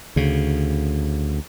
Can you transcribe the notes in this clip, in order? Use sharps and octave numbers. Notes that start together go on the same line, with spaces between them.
D2 C#3